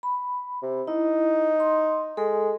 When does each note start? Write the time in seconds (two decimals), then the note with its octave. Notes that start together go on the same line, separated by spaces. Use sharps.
0.03 B5
0.62 C3
0.88 D#4 E4
1.60 C6
2.17 G#3 A4